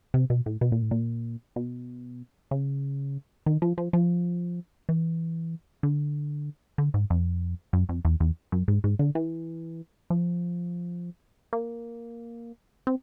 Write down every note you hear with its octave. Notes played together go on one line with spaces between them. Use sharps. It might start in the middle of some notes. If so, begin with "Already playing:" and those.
C3
B2
A2
B2
A#2
A2
A#2
B2
C#3
D#3
F3
F3
F3
E3
D3
D3
G#2
F2
F#2
F2
E2
E2
F#2
G#2
G#2
D3
E3
F3
A#3
C4